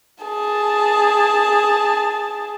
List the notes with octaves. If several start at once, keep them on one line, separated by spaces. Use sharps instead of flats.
G#4 A5